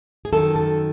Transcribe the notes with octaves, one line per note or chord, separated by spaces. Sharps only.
G#4
F#2 D#3 A4
A4